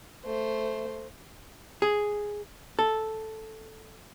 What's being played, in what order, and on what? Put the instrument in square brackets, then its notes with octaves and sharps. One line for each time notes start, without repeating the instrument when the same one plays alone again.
[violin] A3 C5
[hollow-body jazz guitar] G#4
A4